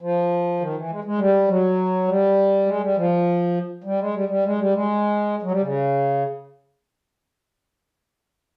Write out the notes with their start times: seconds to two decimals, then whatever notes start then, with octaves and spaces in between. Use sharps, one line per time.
0.01 F3
0.60 D#3
0.75 E3
0.90 G#3
1.04 G#3
1.18 G3
1.48 F#3
2.08 G3
2.66 G#3
2.81 G3
2.97 F3
3.84 G3
3.99 G#3
4.14 G3
4.28 G3
4.44 G#3
4.58 G3
4.73 G#3
5.42 F#3
5.51 G3
5.61 C#3